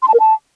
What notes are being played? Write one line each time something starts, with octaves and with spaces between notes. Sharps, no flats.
C6
A5
A#4
A5